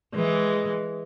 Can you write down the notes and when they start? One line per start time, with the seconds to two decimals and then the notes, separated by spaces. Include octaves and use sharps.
0.14 E3 G#3